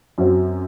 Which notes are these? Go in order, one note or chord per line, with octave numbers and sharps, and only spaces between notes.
F#2 F#3 C4 F#4 C5